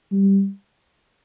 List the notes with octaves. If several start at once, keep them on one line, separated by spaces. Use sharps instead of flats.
G3